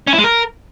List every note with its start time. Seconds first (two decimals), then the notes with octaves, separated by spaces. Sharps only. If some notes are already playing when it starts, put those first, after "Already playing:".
0.07 C#4
0.13 E4
0.18 G#3
0.24 A#4